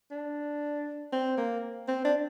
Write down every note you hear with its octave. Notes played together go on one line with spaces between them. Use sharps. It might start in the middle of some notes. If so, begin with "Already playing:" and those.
D4
C4
A#3
C4
D4